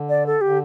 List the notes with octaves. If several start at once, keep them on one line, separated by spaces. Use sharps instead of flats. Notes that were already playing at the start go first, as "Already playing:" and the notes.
Already playing: D3
D5
A4
D3 G4